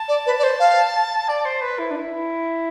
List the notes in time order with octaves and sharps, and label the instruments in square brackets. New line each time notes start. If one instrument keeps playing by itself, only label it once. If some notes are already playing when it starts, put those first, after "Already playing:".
Already playing: [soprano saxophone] A5
[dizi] D5
B4
D5
C5
F5
[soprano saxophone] D5
C5
B4
E4
D4
E4